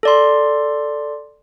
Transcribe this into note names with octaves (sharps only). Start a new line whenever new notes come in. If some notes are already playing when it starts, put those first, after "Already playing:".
A4 D5 C6